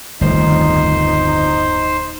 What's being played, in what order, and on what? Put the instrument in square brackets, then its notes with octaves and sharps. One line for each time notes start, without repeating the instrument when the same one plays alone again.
[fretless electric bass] D1 D#3 A3 [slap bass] G1 F2 F3 [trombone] D#4 [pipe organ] C5